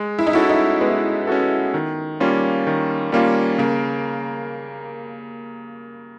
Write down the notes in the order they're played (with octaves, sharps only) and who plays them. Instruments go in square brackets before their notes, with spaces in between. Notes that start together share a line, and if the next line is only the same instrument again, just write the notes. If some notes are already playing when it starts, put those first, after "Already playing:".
Already playing: [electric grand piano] G#3
[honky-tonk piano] E4
D#4
[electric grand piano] C#4 F#4 A4 [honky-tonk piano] E4
[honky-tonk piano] D#4
[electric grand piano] G#3 [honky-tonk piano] B3
[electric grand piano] C#4 F#4 A4
D#3
G3 A#3 C#4 F4
D#3
G3 A#3 C#4 F4
[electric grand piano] C#3 [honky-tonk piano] A#3